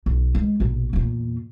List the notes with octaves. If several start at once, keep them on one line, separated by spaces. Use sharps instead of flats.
B1
G#3
A#1 B2
E2 A#2